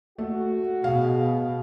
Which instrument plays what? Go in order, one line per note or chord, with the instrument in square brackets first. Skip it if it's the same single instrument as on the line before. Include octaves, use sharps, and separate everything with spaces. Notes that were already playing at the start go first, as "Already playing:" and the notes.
[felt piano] A3 [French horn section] F#4
[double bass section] B2 [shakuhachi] G#4 [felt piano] F5